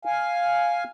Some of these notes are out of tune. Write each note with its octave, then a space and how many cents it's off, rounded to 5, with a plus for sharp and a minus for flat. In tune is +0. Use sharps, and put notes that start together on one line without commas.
F5 +0 G#5 +0